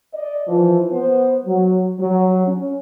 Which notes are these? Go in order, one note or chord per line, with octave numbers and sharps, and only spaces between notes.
D5 D#5
E3 F3
B3 C5
F#3
F#3
C#4